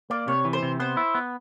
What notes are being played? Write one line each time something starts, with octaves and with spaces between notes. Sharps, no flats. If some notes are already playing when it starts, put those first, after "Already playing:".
A#3 D5
C3 C#5
E3
C5
C3
B3 C5
E4
B3